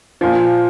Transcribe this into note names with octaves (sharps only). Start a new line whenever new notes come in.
A#2 F3